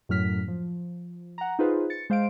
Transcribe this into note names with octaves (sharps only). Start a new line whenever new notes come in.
F#2 A2 F#3 F6 B6
F3
F#5 A#5
D#4 F4 G#4 B4 C5
A6 C#7
G#3 C5 F5 C6 D7